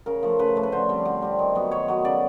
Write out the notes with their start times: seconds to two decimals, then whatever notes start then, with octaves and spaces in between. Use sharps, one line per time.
0.06 C#3 A#4
0.23 F3 A3
0.39 C#3 B4
0.56 F3 A3
0.63 B4
0.72 D3 C5
0.89 G3 C4
1.05 D3
1.22 G3 C4
1.39 D#3
1.55 F#3 B3
1.71 D#3 C#5
1.88 F#3 B3
2.05 C#3 D5